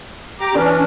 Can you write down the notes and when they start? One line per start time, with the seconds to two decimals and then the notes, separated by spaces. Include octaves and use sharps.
0.40 G4 A#5 D6
0.55 E3 C#4 D4 D5